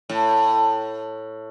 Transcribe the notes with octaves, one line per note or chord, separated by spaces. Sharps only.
A2